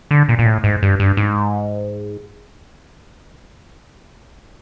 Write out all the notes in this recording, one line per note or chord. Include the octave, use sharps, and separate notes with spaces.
D3
A#2
A#2
A2
G#2
G2
G2
G#2